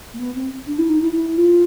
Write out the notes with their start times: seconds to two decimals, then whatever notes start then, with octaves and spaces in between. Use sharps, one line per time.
0.13 A#3
0.19 B3
0.35 C4
0.67 D4
0.78 E4
0.89 D#4
1.01 E4
1.13 E4
1.37 F4